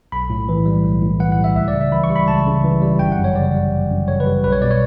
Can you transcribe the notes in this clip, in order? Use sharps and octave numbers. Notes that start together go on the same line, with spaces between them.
B1 B5
A2
E3
G3
B1
A2
E3 F#5
F#5
G3
E5
C#2 E5
D5
C#3
E5
E3 B5
C#6
G3
B5
C#2 A5
C#3
E3
G3
G1 G5
F#5
F#2
C#5
C#3 D5
G3
G1
F#2
C#3 C#5
B4
G3
B1 B4
C#5
B2 D5
C#5